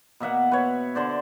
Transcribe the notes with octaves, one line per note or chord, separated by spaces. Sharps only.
B2 A#3 E5 F#5
B4 C#5
D3 C5 D5